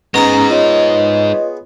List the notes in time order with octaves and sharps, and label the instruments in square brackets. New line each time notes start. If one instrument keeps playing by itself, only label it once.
[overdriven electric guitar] G#3 D#4 [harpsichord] B3 G#4 [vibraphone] C#4 A#5 [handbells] A#6
[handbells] F4 B4 C#5 [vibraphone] D#5